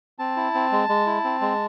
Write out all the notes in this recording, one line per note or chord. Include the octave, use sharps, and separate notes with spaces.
C4 A5
E4
C4
G#3
G#3
E4
C4
G#3